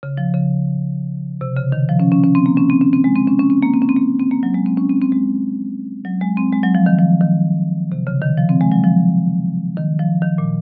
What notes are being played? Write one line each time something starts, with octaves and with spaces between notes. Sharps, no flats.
C#3
F3
C#3
C3
C#3
D#3
F3
C#4
C#4
C#4
C4
A#3
C#4
C4
C#4
C4
G#3
C4
C#4
C#4
C4
A#3
C4
C#4
C4
A#3
C4
A#3
F#3
G#3
C4
C#4
C4
C4
G#3
F#3
G#3
C4
G#3
F#3
F3
D#3
F3
D#3
C3
C#3
D#3
F3
C4
G#3
F#3
F3
D#3
F3
D#3
A#2